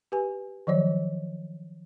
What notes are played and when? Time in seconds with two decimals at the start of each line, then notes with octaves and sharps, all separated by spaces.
0.12 G4 B4 G#5
0.67 D#3 F3 F#3 C#5